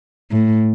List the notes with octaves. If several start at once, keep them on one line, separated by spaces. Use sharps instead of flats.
A2